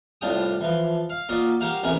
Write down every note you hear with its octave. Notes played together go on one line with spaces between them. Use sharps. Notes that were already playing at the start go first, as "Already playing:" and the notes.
C2 A2 D4 F4 G5 D#6
E3 F3
F5
A#3 F4 F#4 D5 D#5
F#4 G4 A#4 C5 F5
A1 C3 A#4 G#5 B5